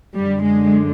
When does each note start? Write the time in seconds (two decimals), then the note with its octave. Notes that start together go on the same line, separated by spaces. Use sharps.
0.14 F#2 D3 G3
0.43 G#3